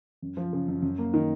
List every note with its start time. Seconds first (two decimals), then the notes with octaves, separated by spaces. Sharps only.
0.22 F#2
0.37 F3
0.53 C#3
0.68 F#2
0.82 F#2
0.98 A#3
1.14 D#3